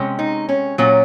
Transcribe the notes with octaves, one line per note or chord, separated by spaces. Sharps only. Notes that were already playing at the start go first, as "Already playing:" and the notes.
Already playing: C3 G#3 C#4
D#4
C#4
A#2 F#3 C#4